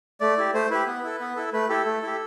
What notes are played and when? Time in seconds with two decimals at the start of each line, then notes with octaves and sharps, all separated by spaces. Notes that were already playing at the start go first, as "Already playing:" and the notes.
0.21 A3 D5
0.38 E4 G4
0.54 A3 C5
0.70 E4 G4 B4
0.87 B3
1.03 E4 A4
1.20 B3
1.36 E4 A4
1.53 A3 B4
1.69 E4 G4 A4
1.86 A3
2.02 E4 G4